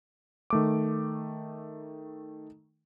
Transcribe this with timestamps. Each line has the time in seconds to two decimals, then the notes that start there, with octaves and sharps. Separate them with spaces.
0.50 D#3 A3 D6